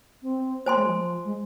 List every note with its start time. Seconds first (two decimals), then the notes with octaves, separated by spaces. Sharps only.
0.22 C4
0.66 A#3 C5 G#5 C6
0.76 G#3
0.86 F3
1.24 G#3